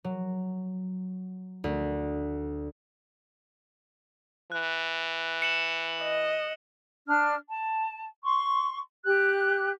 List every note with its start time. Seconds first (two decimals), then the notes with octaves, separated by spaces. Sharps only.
0.04 F#3
1.64 D2
4.52 E3 F#6
5.42 C#7 E7 F#7
6.03 D#5
7.07 D4 F6
7.49 A5
8.24 C6 C#6
9.04 G4 F#6